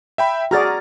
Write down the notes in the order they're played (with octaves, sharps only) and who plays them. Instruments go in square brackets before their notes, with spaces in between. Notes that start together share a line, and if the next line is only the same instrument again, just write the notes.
[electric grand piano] E5 G5 B5
[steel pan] F#4 G#4 D5 [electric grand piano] A#5 F6 A6